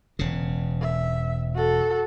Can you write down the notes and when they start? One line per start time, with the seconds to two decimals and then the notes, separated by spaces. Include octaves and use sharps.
0.19 E1 C#3
0.81 E5
1.55 F#4 A4